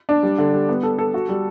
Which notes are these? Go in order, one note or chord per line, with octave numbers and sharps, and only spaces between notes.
D4
G3
D3
G3
B3
A4
A4
F#4
G3